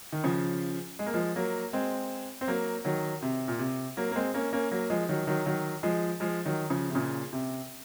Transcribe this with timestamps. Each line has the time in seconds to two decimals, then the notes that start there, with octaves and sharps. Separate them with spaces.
0.12 D#3
0.24 C#3 F3
0.99 G#3
1.06 A#3
1.14 F3 G#3
1.36 F#3 A#3
1.73 G#3 C4
2.41 C4
2.48 F#3 A#3
2.85 D#3 F#3
3.22 C3
3.48 A#2
3.59 C3
3.97 F#3 A#3
4.11 A#3
4.16 G#3 C4
4.34 A#3 C#4
4.53 A#3 C#4
4.71 F#3 A#3
4.90 F3 G#3
5.09 D#3 F#3
5.27 D#3 F#3
5.46 D#3 F#3
5.83 F3 G#3
6.20 F3 G#3
6.45 D#3 F#3
6.70 C#3 F3
6.90 C3
6.95 A#2 C#3
7.33 C3